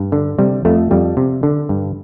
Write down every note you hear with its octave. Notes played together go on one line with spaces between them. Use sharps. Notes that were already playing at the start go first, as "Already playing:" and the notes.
Already playing: G2
D3
C3 G3
F2 A3
F2 G3
C3
D3
G2